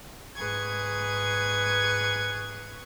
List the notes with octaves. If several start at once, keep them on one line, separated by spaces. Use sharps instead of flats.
G#2 G#4 B4 C#6 G#6